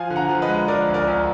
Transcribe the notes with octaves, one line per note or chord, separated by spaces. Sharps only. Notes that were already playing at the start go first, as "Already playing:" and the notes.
Already playing: F3 F5 G#5
D3
F#5 A#5
F3
B4 D#5
G#3
F3 A#4 D5
D2
A#4 D5
D2